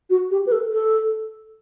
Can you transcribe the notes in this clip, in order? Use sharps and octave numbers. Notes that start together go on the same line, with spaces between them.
F#4
G4
B4
A4
A4